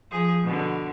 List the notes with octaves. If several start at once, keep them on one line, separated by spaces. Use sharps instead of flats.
F3 G#4
B2 D3